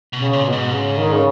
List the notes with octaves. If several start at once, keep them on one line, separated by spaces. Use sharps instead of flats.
B2
C#3
A#2
B2
G#2
C#3
D#3
C#3